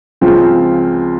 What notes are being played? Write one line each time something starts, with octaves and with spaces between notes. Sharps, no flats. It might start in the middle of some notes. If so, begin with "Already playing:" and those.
C#2 C#3 F3 C4 F4